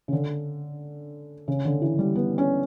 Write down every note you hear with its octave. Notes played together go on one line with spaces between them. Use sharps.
C#3
D3
C#3
D3
E3
G3
B3
C#4